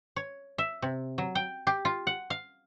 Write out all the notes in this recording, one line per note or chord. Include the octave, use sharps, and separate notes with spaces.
C#5
E5
C3
F#3
G5
G4
F4
F#5
F5